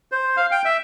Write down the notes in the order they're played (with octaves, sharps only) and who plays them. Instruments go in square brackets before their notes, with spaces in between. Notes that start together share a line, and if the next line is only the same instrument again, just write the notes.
[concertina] C5
F5
G5
E5